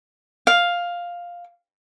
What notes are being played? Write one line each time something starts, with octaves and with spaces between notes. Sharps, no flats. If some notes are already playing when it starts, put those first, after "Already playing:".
F5